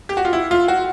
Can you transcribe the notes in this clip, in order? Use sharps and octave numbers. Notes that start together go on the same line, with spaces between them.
G4
F#4
F4
E4
F4
F#4